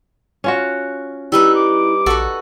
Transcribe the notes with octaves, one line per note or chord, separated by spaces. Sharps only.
C#4 F4 F#4
G3 D#4 E4 B4 E6
D6
A#1 F#4 A4 B4